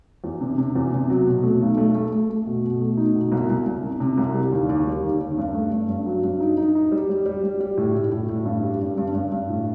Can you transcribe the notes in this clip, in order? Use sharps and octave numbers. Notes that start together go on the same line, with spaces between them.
E2
C3
C3
E2
C3
F#3
B2
A3
B1
A3
A3
A3
A3
B2
B2
A3
D#4
B2
C2
C2
C2
C3
C3
C2
G3
D#2
D#2
G3
D#2
D#2
G2
A3
G2
G2
F#3
G2
D#4
D#4
D#4
G3
G3
G3
G3
G3
A2
A2
A2
A2
G2
G3
G2
G2
G2
G2
A2